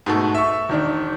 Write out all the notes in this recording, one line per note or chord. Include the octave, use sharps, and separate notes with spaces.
G#2 B2 A3
E5 C#6
E1 D#3 D4